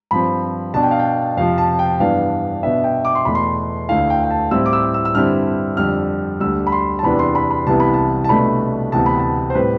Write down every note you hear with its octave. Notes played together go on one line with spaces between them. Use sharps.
G2 F3 C4 B5
B2 B3 D4 A5
G5
F5
G5
F2 C3 F3 F5
A5
G5
G2 E3 B3 D4 F5
B2 B3 D4 E5
G5
D6
C6
E2 B2 A3 B5
C6
D2 D3 A3 E4 F5
G5
G5
A5
A2 G3 C4 E4 E6
D6
E6
E6
E6
G2 D3 G3 C4 E4 F6
F2 D3 G3 F6
D2 D3 G3 E6
B5
C6
A5
E2 C3 E3 B3 D4 B5
C6
B5
B5
C2 C3 E3 B3 E4 A5
B5
A5
A5
C2 B2 A3 D4 B5
D2 C3 E3 B3 A5
B5
A5
C5
A2 G3 C4 B4